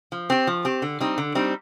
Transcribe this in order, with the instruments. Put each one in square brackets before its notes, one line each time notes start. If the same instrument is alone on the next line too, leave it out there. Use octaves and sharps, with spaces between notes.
[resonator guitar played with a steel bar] F3
C4 G4
F3
C4 G4
D3
G3 C4 D#4
D3
G3 C4 D#4